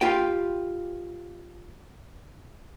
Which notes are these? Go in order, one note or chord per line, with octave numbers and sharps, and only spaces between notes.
F4 G4 B4 G5